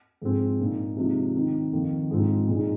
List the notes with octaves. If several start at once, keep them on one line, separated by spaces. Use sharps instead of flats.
G#2 F3 G#3 C4
A#2 A#3 D#4
C3 F3 G#3 D#4
D#3 C4 D#4
F2 D#3 A#3
G#2 F3 C4 D#4
A#2 G#3 D#4